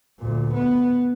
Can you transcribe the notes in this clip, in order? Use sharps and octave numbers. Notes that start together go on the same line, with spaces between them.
D2 A#2
B3